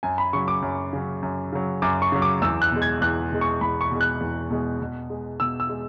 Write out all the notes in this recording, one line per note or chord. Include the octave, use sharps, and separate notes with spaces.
F#2 G#5
B5
C#3 F#3 C#6
D6
F#2
C#3 F#3
F#2
C#3 F#3
F#2 D6
C#6
C#3 F#3
D6
E2 E6
F#6
B2 G#3
G#6
E2 F#6
B2 G#3
C#6
E2 B5
C#6
B2 G#3
F#6
E2
B2 G#3
B2
G#3
B2 E6
E6
G#3